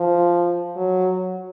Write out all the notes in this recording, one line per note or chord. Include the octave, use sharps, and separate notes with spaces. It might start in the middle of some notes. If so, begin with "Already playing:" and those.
Already playing: F3
F#3